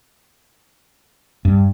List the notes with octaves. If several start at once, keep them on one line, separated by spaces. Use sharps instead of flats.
G2